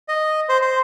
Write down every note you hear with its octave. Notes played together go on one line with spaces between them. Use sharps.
D#5
C5
C5